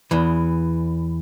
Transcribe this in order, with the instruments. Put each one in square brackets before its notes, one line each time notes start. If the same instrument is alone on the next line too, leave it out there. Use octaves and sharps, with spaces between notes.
[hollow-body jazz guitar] E2 E3